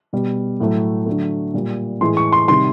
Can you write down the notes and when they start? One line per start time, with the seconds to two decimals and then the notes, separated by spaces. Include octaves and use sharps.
0.13 B2 G3
0.60 A2 F#3 A3
1.06 D3 F#3 A3
1.54 A#2 G3
2.01 A2 E3 G#3 C6
2.17 C#6
2.32 C6
2.48 C3 D#3 G3 C6